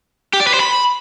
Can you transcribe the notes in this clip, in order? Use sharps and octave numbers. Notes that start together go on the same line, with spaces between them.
G4
D5
B4
C5
B5